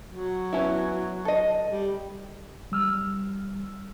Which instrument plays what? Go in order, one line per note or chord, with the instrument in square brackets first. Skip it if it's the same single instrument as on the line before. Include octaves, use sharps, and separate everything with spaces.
[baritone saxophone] F#3
[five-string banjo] B3 C#4 E4
A4 D#5
[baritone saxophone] G3
[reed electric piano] G3 E6 F6